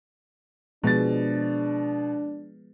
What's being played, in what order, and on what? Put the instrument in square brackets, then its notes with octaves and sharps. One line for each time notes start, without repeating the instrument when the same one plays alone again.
[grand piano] B2 A6 [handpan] F3 G#3 B3 [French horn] D4